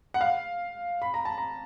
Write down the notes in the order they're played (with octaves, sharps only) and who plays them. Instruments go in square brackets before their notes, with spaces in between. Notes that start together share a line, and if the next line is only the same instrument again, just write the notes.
[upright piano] F#5
F5
B5
A#5
A5
A#5